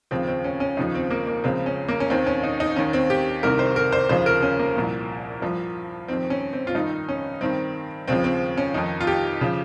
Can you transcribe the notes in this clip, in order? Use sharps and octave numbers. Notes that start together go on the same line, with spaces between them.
D#2 C#3 F3 C4
C4
C#4
C#4
D#2 C#3 F3 D#4
C4
A#3
A#3
C#2 C#3 F3 C4
C#4
A#3
C#4
D#2 D#3 C4
C#4
D#4
D#4
D#2 D#3 C#4
C4
G4
C2 C3 D#3 A#4
C5
A#4
C5
D#2 C#3 F3 C5
A#4
C#4
A#3
C2 A#2 F3
G2 F3
F2 D#3 C4
C#4
C4
F4
G2 D#3 D#4
C#4
G2 D#3 C4
D#2 C#3 F3 C4
C4
C#4
F2 D#3 D#4
F4
G4
C#3 F3